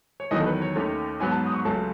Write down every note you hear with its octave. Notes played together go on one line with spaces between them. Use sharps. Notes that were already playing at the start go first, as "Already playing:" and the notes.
C#5
E2 D#3 F#3 B3 D#5
A4
B4
C#5
D#2 D#3 A3 C#4
G#2 F#3 B3 G#5
A5
D#6
C#6
C#2 C#3 F#3 A3 A5